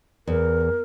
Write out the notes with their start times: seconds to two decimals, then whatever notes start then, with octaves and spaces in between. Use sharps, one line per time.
0.27 E2 A#4